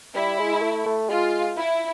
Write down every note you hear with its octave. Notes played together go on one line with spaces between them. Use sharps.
G3 E4
G#3
A3
A3
G#3 F4
E4